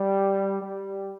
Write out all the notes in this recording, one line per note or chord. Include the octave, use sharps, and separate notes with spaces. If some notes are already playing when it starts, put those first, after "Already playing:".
Already playing: G3
G3